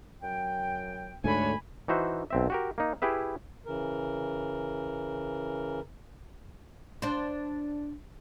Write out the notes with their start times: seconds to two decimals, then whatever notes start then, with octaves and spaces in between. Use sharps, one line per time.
0.22 F#2 F#3 G5
1.24 D2 G#2 D3 A3 D4 C#5 G#5 B5
1.88 E3 D#4 F#4 C5 E5
2.30 B1 C4 E5
2.50 F#4 G4 A#4
2.78 A#3 D#4
3.02 E4 G4 G#4 B4 E5
3.66 C#3 E3 A#4
7.02 D4 C5